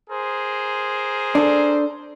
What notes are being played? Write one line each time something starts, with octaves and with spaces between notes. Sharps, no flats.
G#4 A#4 C5
D4 A4